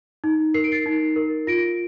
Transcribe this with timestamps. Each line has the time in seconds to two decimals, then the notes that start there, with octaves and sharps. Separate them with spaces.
0.24 D#4
0.54 A#4 C7
0.64 D7
0.72 A6 C7
0.86 D#4
1.16 A#4
1.47 F4 A#6 D7